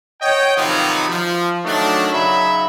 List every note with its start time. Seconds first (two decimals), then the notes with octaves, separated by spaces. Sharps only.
0.21 C#5 D#5 F#5 G5
0.57 C3 D#3 F3 F#3 B3 D#4
1.09 F3
1.65 D#3 F#3 A3 D4
2.12 C#3 F#3 D#4 E5 B5